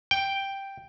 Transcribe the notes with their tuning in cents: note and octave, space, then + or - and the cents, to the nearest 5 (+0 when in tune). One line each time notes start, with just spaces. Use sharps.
G5 +0